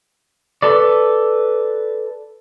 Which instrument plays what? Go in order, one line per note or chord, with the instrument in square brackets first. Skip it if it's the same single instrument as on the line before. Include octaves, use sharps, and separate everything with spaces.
[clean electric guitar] A4 B4 D5